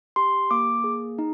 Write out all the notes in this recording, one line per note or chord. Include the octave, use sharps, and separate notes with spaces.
G4 C6
A#3 D6
G#4
D#4